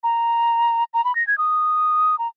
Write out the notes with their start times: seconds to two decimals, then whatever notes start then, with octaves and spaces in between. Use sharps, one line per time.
0.03 A#5
0.94 A#5
1.05 B5
1.15 A#6
1.27 G#6
1.38 D#6
2.19 A#5